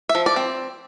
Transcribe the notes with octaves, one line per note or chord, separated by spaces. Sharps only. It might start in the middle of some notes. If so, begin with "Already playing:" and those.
E5
F3
D5
C4